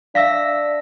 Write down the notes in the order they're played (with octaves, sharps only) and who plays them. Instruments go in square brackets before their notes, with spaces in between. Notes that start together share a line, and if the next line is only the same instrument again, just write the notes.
[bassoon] D4 [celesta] E5 F5 [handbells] E6 A#6 B6